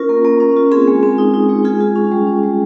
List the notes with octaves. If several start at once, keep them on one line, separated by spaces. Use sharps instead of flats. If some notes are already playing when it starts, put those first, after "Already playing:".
Already playing: C#4 F4 A#4
A#3
A#3
C#4
F4
C4 G#4
G#3
C4
D#4
D#4
G#3
F4 G#4
F4
C#4
G3
C#4
G3